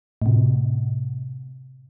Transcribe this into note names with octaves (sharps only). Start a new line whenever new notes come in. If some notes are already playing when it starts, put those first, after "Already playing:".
A2 C3